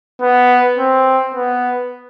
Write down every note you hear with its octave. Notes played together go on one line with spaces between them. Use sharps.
B3
C4
B3